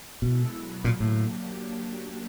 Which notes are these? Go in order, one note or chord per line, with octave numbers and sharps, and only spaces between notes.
B2 G#3 B3 E4 A4
B2 F#3 B3
A#2 D3 F#3 A#3
A2
F#3 A#3 D4 G4